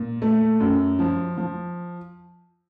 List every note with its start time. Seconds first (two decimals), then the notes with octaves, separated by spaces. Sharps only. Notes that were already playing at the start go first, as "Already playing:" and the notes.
Already playing: A#2
0.22 A3
0.60 F#2
0.99 F3
1.38 F3